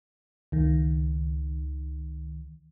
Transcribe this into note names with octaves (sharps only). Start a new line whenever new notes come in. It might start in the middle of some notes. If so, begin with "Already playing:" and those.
C#2 D#3